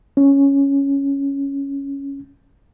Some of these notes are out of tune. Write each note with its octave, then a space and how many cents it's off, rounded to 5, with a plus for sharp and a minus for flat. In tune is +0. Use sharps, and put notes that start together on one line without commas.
C#4 +0